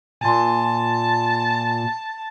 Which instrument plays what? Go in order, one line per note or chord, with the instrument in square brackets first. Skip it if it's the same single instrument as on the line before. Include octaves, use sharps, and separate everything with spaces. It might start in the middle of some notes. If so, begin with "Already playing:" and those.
[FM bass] A#2 [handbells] G#5 C6 [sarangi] A5